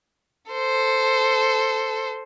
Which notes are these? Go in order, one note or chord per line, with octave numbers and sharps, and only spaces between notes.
A4 C5